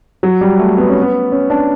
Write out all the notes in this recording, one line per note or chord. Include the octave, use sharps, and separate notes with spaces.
F#3
G3
A3
B3
C#4
B3
C#4
D4